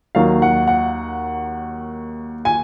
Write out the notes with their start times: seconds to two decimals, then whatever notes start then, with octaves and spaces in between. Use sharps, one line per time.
0.15 D#2 D#3 F#3 F5
0.42 F#5
0.67 F#5
2.45 G#5